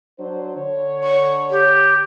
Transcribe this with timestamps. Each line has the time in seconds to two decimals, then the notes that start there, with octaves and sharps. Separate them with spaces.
0.18 F#3 D4 C5
0.56 D3 C#5
1.03 C#6
1.50 G4